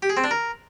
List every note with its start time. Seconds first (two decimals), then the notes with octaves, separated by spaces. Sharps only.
0.02 G4
0.10 G#4
0.17 C4
0.24 D4
0.31 A#4